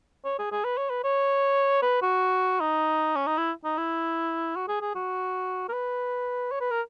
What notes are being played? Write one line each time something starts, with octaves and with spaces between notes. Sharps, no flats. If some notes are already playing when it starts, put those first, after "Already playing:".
C#5
G#4
G#4
B4
C#5
B4
C#5
B4
F#4
D#4
C#4
D#4
E4
D#4
E4
F#4
G#4
G#4
F#4
A#4
B4
C#5
B4
A#4